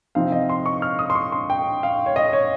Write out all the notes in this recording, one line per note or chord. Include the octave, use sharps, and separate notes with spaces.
C3 F3 C4 D#4 F5
D#5
C6
C#6
F6
D#6
C6
C#6
C6
G5
F5
C#5
D#5
C#5